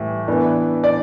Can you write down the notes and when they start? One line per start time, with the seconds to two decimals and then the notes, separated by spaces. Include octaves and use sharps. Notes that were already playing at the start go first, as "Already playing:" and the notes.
Already playing: A2 E3 G3
0.28 E3 B3 D4
0.84 D5